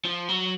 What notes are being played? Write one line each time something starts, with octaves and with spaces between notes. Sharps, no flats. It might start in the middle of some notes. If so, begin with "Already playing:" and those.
F3
F#3